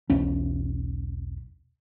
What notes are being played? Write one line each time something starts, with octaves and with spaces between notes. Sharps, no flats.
E1 B1 E3 C#4